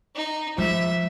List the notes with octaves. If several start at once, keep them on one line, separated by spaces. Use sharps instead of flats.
D#4
F3 G#3 E5